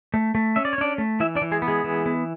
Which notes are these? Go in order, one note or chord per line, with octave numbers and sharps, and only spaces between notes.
A3
A3
C#4 E5
D5
C#5
C#4 D4 D5
A3
E3 E4 E5
D4 D5
E3
G#3 G#4
B3
G#3 G#4
E3
B3